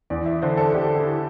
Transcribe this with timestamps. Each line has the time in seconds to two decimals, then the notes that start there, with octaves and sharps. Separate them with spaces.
0.10 E2 D5
0.26 E5
0.42 D3 C5
0.57 A4
0.74 D3 G4
0.95 E4